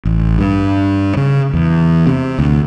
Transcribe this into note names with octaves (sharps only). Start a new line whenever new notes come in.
A1
G2
C#3
E2
C3
D2